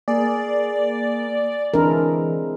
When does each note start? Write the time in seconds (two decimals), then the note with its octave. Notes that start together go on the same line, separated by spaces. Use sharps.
0.08 A#3 G#4 D5
1.74 C3 E3 G#3 D4 E4 A#4